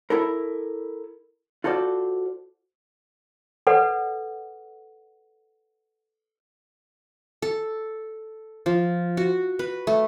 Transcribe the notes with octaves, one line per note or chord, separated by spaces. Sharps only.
E4 A4 A#4
F4 F#4 A4 C5 D5
A4 B4 D5 F#5
A4
F3
F#4
B4
A3